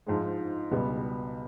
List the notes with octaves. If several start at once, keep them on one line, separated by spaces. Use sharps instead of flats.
G#2 F3 G#3
C#2 B2 G3 B3